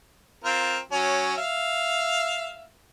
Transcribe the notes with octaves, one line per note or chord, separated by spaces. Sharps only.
C4 F4 A#4
F#3 C#4
E5 F5